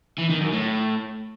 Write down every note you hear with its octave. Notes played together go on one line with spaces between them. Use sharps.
E3
D#3
F#2
A2